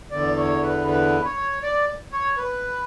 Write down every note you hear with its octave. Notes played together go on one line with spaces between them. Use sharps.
E2 D3 D5
C#5
B4
B4
C#5
D5
C#5
B4